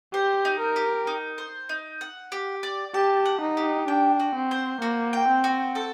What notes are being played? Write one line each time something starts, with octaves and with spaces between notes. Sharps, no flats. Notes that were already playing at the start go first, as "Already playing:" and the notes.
G4 C5
D#4
A#4
G4
D#4
C5
D#4
F#5
G4
D5
G4 A5
F#5
D#4
G4
D4 G5
F#4
C4
C5
A#3 F#4
G5
C4
F#4
A4